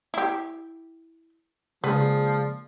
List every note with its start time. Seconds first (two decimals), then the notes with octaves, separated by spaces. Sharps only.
0.14 E4 G4
1.84 C#3 F3 G#3 A#3 G#4 B4 D5